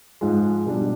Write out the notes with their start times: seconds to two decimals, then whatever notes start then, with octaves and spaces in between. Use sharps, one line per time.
0.21 G#2 F3 G#3
0.67 B2 G3 D4